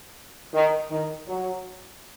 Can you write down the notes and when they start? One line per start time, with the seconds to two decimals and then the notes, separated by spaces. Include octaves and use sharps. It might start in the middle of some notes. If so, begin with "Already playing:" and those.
0.53 D#3
0.90 D#3
1.28 F#3